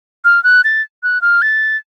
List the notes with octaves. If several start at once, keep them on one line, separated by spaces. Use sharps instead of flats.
F6
F#6
A6
F#6
F6
A6